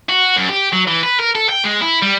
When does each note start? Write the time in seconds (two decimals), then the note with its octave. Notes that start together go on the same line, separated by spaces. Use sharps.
0.09 F#4
0.37 F#2
0.50 G4
0.73 F#3
0.88 E3
1.03 B4
1.20 A#4
1.35 A4
1.49 G5
1.64 G#3
1.82 E4
2.02 G3